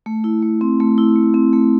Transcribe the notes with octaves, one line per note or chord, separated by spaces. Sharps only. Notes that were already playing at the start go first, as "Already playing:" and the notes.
A3
E4
A3
C4
A3
E4
A3
C4
A3